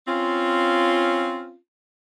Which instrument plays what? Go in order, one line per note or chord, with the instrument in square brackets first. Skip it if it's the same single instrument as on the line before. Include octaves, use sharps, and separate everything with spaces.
[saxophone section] C4 C#4 F4